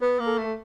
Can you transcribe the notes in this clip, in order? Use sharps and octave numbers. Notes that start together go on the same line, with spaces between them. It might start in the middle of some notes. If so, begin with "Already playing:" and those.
B3 B4
A#3
A4
A3